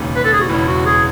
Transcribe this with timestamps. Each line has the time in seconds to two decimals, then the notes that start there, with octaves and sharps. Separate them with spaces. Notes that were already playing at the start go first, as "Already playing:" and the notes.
Already playing: E1 D#2 C#3
0.16 B4
0.25 A4
0.33 G#4
0.41 F#4
0.49 E1 E2 C#3 E4
0.68 F#4
0.86 G#4